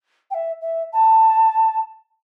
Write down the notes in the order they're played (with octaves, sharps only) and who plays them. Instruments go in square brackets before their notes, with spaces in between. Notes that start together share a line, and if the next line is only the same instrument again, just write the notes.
[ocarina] G5
E5
E5
A5